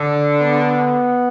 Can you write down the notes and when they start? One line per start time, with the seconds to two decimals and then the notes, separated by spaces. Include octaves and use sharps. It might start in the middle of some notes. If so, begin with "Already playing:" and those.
Already playing: D3
0.42 B3